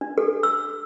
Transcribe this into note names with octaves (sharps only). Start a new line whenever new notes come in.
D4
A4
E6